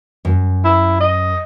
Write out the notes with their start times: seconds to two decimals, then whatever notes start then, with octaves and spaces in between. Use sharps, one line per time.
0.25 F#2
0.64 E4
1.01 D#5